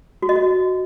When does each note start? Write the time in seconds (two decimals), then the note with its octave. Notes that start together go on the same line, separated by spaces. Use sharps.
0.22 F#4
0.29 D#5
0.36 F#4